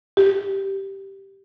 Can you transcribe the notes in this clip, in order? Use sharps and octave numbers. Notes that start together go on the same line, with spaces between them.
G4